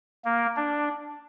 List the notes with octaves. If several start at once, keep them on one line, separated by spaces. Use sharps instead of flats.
A#3
D4